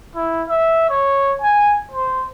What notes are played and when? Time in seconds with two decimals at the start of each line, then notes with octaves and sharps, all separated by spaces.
0.16 E4
0.49 E5
0.90 C#5
1.42 G#5
1.91 C5